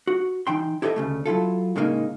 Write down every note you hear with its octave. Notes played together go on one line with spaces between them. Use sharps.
F#4
E3 D#4 G5 C6
E4 G4 A4 C#5 D#5 E5
D2 C#3 A3
F#3 E4 F4 A4
A2 C#3 G#3 A#3 D4 D#4